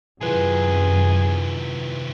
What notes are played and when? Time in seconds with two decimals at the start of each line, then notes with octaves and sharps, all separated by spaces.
0.21 F#2 C3 D#3 E4 F4 G#4 B4